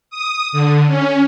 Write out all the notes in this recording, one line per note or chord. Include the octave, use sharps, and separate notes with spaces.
D#6
D3
C#4